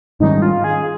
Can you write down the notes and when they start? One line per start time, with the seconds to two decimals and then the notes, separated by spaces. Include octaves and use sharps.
0.20 G#2 D#3 G3 C#4 D#4
0.42 F4
0.64 G#4